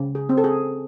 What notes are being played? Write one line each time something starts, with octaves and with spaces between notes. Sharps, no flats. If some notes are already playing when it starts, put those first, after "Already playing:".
Already playing: C#3
G#4
C4
A4
G#4